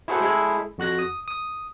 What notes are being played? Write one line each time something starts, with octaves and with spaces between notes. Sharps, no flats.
E4 F#4 G#4 A4 C5 F#5
G#3 E4 G#4 A4
F2 F#4 F#6 A#6
D#6
D#6